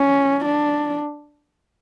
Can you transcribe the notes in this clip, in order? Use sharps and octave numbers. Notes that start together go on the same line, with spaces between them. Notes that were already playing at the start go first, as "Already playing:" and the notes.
Already playing: C#4
D4